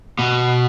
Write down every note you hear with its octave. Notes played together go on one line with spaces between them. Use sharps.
B2